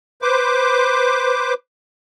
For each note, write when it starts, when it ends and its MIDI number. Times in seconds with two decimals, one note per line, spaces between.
0.22 1.54 71
0.22 1.54 72
0.22 1.54 86